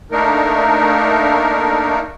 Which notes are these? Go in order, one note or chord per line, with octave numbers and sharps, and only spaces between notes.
A3 A#3 D4 D#4 A#4